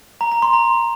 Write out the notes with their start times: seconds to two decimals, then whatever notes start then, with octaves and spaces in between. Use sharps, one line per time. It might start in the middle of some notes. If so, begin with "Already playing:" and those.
0.21 A#5
0.32 A#5
0.42 C6
0.53 A#5